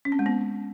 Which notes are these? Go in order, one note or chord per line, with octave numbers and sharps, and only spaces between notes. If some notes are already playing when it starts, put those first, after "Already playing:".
C#4
C4
G#3
B3